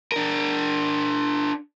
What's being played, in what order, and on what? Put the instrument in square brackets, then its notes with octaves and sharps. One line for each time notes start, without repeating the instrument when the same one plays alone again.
[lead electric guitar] D4 A#4